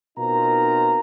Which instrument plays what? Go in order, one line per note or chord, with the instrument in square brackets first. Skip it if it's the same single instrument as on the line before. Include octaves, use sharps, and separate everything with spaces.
[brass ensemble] B2 C4 D#4 F4 A#4 A#5